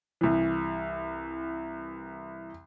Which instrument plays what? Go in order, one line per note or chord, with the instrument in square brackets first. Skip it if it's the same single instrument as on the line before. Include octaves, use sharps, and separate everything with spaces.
[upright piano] C2 E3